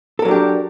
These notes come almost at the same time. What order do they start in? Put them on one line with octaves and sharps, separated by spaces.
A4 A#4 F#3 D4 G4